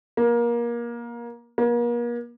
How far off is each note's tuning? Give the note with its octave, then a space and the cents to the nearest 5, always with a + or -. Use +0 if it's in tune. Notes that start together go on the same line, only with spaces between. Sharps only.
A#3 +25
A#3 +40